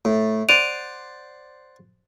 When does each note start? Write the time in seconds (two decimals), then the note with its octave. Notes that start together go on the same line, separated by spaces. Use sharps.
0.05 A2
0.49 C5 D5 F#5 D7 D#7 F7